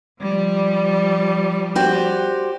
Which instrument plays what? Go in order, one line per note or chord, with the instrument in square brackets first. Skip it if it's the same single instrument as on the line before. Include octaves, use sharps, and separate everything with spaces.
[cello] F3 G3
[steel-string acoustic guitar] F#4 G4 C5